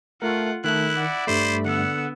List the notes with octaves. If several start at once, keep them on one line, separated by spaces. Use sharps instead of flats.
A3 F4 A#4 F#5
D#3 A3 E4 F#6
D5 F#5
G2 G3 A3 C5 B5
D3 B3 F#5 E6